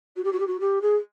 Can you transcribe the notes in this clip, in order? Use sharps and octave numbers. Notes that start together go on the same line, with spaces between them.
F#4
G4
F#4
G4
F#4
G4
G#4